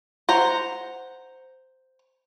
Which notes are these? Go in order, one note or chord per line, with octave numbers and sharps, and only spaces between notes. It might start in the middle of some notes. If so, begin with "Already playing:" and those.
C5 F#5 A#5